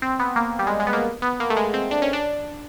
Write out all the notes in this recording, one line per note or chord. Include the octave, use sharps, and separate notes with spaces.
C4
B3
A#3
G3
G#3
G#3
B3
A#3
B3
A#3
A3
G#3
C4
D4
C#4
D4